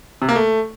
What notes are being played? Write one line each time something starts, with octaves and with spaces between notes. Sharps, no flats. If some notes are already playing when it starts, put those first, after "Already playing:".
C3
A#3
A3